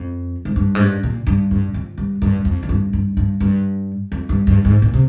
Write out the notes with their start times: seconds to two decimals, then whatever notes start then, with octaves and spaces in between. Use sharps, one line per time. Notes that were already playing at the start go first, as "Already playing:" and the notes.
Already playing: F2
0.45 G#2
0.56 G2
0.75 G#2
0.80 G2
1.03 A#2
1.27 G2
1.51 G2
1.74 F2
1.98 G2
2.22 G2
2.45 F2
2.63 F2
2.69 G2
2.93 G2
3.17 G2
3.41 G2
4.12 F2
4.29 G2
4.47 G2
4.65 G#2
4.82 A#2
4.94 C3